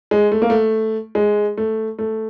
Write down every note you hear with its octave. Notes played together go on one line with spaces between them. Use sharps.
G#3
A3
A#3
A3
G#3
A3
A3